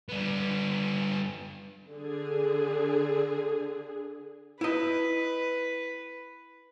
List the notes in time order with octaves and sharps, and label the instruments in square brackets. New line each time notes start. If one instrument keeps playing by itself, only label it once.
[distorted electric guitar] G3 B3
[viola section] D3 G#4
[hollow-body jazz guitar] E4 D#5 [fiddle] B4